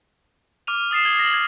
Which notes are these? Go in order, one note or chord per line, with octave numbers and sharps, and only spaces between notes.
D6 F6 D#7 F7
D#6 A6 C7 E7
G#6 C7 G7
A#6 F#7
G#6